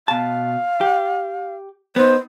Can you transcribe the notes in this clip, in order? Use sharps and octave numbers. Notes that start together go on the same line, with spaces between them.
B2 F5 A5
G4
B3 D#4 C5